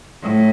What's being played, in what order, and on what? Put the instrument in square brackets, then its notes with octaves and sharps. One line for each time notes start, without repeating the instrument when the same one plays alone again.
[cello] A2